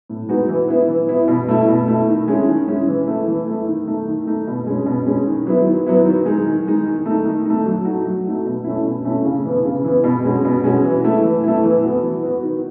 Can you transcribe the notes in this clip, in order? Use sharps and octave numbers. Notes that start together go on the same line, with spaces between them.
A2
G#3 B3 D#4 F#4
E3
B3 E4
E3
B3 E4
B2
A3 E4
B2
A3 E4
D#3
G#3 C#4 E4
D#3
G#3 C#4 E4
E3
A3 E4
E3
A3 E4
D#3
A3 D#4
D#3
A3 D#4
B2
G#3 C#4
B2
G#3 C#4
D#3
F#3 B3 E4
D#3
F#3 B3 E4
D#3
G#3 D#4
D#3
G#3 D#4
D#3
A3 D#4
D#3
A3 D#4
F#3
A3 D#4 F#4
F#3
A3 D#4 F#4
B2
A3 C#4 E4
B2
A3 C#4 E4
C#3
E3 B3
C#3
E3 B3
B2
G#3 C#4 F#4
B2
G#3 C#4 F#4
E3
A3 E4
E3
A3 E4
E3
B3 F#4
E3
B3 F#4
D#3